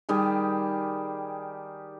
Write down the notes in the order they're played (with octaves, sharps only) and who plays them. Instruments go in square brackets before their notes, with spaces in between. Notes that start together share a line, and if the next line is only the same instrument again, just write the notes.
[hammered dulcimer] D#3 G3 G4 G#4